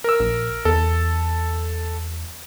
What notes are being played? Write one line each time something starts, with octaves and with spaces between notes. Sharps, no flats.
A#4 E6
A#1
E2 A4